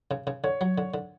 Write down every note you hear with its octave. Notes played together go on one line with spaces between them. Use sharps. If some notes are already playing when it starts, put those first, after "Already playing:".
C#3
C#3
D3 C#5
F#3
D3
D3